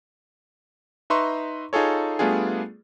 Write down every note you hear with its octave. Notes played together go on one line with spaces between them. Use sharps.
D#4 B4 E5 A#5 C6 C#6
D#4 F4 G#4 A4 C#5
G3 A3 B3 D4 F4 G#4